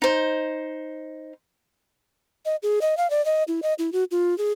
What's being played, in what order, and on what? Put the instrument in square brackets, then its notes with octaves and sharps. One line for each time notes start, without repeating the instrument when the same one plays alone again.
[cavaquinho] D#4 C5
[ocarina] D#5
G#4
D#5
F5
D5
D#5
E4
D#5
E4
F#4
F4
G#4